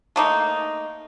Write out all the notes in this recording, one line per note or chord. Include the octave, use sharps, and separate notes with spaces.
A3 A#3 D#4